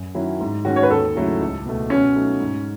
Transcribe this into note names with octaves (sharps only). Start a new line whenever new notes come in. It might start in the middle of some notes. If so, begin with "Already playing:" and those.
Already playing: F#2
D#3 F#3 C#4 E4
G#2
D#3 G#3 C#4 F#4
C#5
B4
D#2 A4
C#3 F#3 A3 E4
C#2
B2 A3
B2 C#4
F#3 A3 D#4
G#2